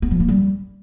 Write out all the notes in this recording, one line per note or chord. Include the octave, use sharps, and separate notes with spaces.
B3
F3
A#3
G3